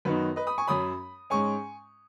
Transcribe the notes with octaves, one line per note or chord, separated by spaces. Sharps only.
F#2 D#3 B3 D#4 F#4 B4
B4 D#5
B5 D#6
G#5 C#6
F#2 F#3 C#4 B5 D#6
G#2 G#3 C#4 G#5 C#6